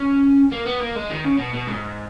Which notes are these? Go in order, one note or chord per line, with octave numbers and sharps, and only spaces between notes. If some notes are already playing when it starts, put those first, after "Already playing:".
Already playing: C#4
A#3
B3
A#3
G#3
D#3
C#3
B2
B2
G#2